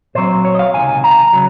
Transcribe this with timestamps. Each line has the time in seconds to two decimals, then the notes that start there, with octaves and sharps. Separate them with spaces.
0.15 A#2 F#3 C4 C5
0.45 C#5
0.55 D#5
0.59 F5
0.74 C#2 C3 D#3 G#5
1.04 A#5
1.33 C#3 F#3